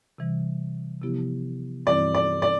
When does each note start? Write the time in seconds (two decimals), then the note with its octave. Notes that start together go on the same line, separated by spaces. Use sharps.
0.18 C3 E3 G3
1.02 C3 F3 B3 E4 G4
1.86 G2 E3 G3 C4 E4 D5
2.15 D5
2.42 D5